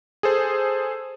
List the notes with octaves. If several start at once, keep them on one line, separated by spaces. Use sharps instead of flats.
G#4 A4 C5